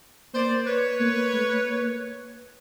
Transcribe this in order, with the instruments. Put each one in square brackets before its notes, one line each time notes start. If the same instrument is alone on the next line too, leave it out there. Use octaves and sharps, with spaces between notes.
[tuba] A#3 [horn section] C5 D5
[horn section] B4 C#5
[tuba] A#3
A3
A#3